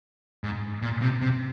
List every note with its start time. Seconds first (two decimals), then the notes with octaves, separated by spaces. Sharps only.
0.44 G#2
0.82 A#2
1.02 C3
1.21 C3